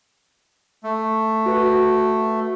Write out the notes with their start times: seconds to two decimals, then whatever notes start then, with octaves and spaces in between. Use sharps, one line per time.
0.84 A3
1.46 F#4 B4 F#5